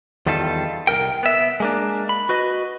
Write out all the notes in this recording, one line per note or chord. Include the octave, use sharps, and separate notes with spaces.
E2 D#3 G3 F4 A4
C2 E3 A#4 G5
B3 E5
G#3 A#3 D4
B5
F#4 B4 D#5